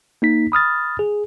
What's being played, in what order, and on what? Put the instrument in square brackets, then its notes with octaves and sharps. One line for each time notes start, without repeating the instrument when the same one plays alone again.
[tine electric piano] A#3 D#4 B6
B5 D#6 F6 A6
G#4